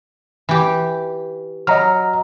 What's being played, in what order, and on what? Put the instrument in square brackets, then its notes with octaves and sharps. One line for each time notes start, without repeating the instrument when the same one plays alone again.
[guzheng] E3 G4
[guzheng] F#3 [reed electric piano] D#5 A#5 F6